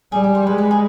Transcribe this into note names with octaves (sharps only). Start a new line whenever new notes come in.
G3 G#4
G4
C5
G#3 B4
B4
G#4